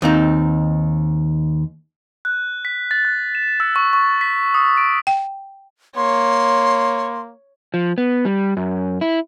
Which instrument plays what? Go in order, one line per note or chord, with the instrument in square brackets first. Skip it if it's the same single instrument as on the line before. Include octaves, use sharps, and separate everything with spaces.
[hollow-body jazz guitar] D#2 C4 D#4
[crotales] F#6
B6
A6
F#6
E7
E6
C#6
C#6
B6
D#6
D7
[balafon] G5
[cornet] A#3 [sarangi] C#5 [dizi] C6
[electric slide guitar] F3
B3
G3
F#2
E4